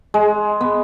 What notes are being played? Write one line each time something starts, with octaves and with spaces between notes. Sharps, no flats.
G#3
B3